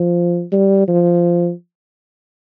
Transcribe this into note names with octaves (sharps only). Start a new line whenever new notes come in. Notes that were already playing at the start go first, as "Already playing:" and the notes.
Already playing: F3
G3
F3